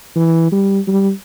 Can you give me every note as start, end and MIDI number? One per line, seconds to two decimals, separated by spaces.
0.16 0.49 52
0.52 0.79 55
0.88 1.10 55